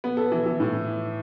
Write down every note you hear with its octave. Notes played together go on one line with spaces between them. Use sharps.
B3
A4
E3
E3
A2